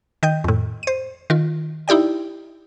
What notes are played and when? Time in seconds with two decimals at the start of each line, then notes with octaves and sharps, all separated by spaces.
0.23 D#3 D#5 G5 G6
0.44 F2 A2
0.83 C5 D#7
1.30 D#3 F4
1.88 D#4 E4 G4 D5 G5